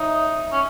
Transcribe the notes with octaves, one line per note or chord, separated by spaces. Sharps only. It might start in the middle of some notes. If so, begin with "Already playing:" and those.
Already playing: D#4 C#5 E5
C#4